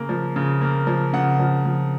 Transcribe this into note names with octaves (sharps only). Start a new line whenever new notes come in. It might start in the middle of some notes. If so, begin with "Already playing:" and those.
Already playing: C#3 A#3
F3
C#3
A#3
F3
C#3 F#5
F3
F3